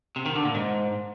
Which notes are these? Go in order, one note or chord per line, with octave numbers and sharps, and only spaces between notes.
C3
D#3
D3
A#2
G#2